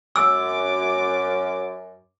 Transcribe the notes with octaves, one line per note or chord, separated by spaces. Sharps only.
F#2 D6 E6